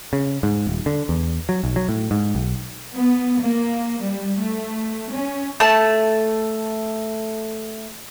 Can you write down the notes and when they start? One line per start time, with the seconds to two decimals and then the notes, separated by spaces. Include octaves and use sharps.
0.13 C#3
0.43 G#2
0.67 D#1
0.86 D3
1.09 E2
1.49 F#3
1.64 B1
1.76 F#3
1.89 A2
2.11 G#2
2.35 B1
2.94 B3
3.41 A#3
4.02 G3
4.41 A3
5.11 C#4
5.60 A3 A5